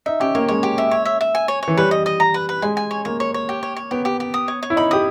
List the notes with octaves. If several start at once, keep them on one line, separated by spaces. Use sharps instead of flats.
D#4 E5
C#4 G4
A#3 C#5
G#3 C#5
G4
E5
C#5
E5
E5
G#5
C#5
C#5
E3
G3 B4
D#5
D#5
A#5
B4
B4
G#3 G#5
G#5
C#5
A#3 C#5
C#5
C#5
G4
C#5
C#5
B3 G4
G4
G4
D#6
C#5
C#5
E4
D#4 B5
G4 D#6